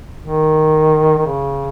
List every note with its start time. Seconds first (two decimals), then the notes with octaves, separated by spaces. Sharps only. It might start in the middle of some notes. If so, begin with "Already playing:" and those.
0.22 D#3
1.17 D#3
1.26 C#3